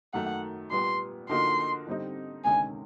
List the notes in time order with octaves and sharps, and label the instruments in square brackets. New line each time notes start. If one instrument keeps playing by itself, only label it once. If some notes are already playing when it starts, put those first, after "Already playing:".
[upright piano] F#2 D#3 F#3 A3 [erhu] F#5
[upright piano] A#2 G3 B3 [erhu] C6
[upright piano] D3 F3 A#3 D#4 F#4 [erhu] C6
[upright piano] D3 G3 C4 D#4
[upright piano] D2 C3 D#3 G#3 C#4 [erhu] G#5